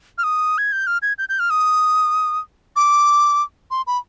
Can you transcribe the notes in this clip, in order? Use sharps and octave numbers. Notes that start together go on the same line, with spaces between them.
F6
D#6
G#6
G6
F6
G#6
G6
G6
F6
D#6
D6
C6
B5